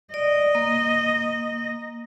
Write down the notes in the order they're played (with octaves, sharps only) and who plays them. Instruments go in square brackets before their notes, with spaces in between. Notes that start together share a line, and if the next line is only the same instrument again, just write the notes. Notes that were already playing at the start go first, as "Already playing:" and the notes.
[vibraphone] D5 [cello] D#5
[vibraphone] A#3